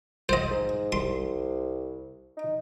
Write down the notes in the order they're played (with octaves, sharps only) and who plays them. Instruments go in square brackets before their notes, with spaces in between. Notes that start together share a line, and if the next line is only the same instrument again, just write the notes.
[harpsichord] C5 D#5
[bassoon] G#2
[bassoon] C2 [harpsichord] C6
[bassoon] D#4